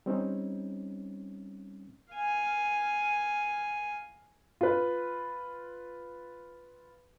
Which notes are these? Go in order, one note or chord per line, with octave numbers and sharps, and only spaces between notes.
G3 C4 C#4 D#4
F5 G#5
F4 B4